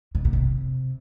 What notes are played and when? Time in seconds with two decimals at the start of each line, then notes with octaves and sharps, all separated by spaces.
0.15 C3
0.25 A#2
0.33 C3